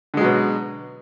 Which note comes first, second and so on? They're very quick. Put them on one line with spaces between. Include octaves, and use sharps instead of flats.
D3 G#3 F#3 B2